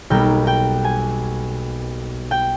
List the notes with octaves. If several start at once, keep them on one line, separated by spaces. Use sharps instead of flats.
B1 B2 G3 A#3 G5
G5
G#5
G5